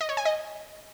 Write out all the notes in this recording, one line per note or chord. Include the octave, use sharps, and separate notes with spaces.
D#5
C#5
G#5
D#5